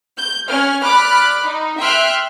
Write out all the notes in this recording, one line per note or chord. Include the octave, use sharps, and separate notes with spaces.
G6
C#4 F6
D5 B5 D6 F6 F#6
D#4
E5 G5 C6 F6 F#6